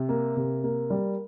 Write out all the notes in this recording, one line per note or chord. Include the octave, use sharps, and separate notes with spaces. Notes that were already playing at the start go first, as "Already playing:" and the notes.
Already playing: C3
A#3
C3
A#3
G3